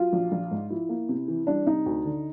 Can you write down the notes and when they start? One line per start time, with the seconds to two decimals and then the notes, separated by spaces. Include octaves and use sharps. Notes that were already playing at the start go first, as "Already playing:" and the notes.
Already playing: F#3 F4
0.13 A#1
0.32 A#1
0.51 G#2
0.70 F3 E4
0.89 A#3
1.09 C3
1.28 E3
1.47 G3 D4
1.66 C3 D#4
1.86 D2
2.05 D3